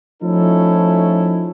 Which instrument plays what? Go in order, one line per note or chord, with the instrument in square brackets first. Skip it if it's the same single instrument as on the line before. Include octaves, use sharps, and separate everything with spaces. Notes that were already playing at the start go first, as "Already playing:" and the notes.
[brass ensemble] F3 A3 C#4 D#4 E4 A4